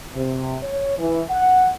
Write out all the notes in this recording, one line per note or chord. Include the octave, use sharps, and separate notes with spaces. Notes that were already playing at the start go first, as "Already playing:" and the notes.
C3
C#5
E3
F#5